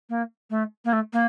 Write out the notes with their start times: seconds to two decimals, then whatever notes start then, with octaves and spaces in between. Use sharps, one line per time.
0.09 A#3
0.50 A3
0.85 A#3
0.93 A3
1.13 A#3